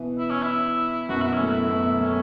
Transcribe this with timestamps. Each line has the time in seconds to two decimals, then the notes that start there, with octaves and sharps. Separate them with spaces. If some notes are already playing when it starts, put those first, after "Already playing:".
Already playing: B2 E3
0.19 E4
0.31 C#4
0.43 E4
1.09 F#2 B2 F#4
1.21 E4
1.33 C#4
1.40 A2
1.46 E4
1.69 F#2 B2
1.99 A2 C#4